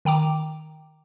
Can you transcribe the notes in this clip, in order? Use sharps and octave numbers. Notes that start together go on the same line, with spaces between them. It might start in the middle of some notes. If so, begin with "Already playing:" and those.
D#3 G5 A#5 D6